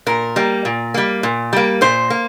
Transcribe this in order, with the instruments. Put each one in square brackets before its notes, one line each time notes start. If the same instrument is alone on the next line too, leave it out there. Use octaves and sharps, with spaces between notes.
[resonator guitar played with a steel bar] A#2 A#4
G3 A#3
A#2
G3 A#3
A#2
G3 A#3
A#2 C5
A#3